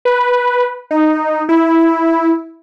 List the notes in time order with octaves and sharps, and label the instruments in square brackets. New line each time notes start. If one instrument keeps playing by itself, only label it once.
[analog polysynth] B4
D#4
E4